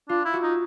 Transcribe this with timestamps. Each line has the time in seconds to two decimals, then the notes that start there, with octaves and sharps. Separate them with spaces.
0.09 D4 F4
0.25 E4
0.34 F#4
0.43 D#4